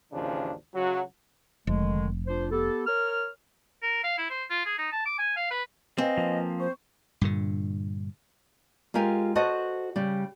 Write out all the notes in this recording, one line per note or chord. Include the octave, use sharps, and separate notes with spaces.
G#1 D#2 C#3 E3 F3 D4
C#2 F#3 F#4
F1 D3 D#3 G#3
D4 F4 C5
B3 G4 A4
A#4 C#5 F6
A#4
F5
E4
C5
F4
G#4
D#4
A5
D6
G#5
F5
B4
C4 B4 D#5 F5 G#5
F3 A#3
C5 C#6
G2 A#2 D3
G#3 F4 G4 A#4 G#5
F#4 A4 C5 D#5 F#5
C#3 G3